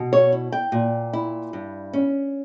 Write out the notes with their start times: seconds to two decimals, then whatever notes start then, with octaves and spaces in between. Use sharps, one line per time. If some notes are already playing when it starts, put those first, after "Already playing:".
Already playing: B2
0.13 C#5
0.32 E4
0.52 G5
0.72 A#2
1.13 E4
1.53 G2
1.93 C#4